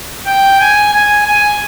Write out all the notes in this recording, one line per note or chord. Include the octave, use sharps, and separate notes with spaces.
G5
G#5
G#5
G#5